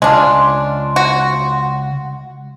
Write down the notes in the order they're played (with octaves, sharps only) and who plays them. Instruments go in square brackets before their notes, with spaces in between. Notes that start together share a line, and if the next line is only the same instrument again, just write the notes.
[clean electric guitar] C#2 F4 [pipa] G#3 D4
[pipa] F#4